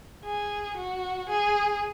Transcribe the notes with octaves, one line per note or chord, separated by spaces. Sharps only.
G#4
F#4
G#4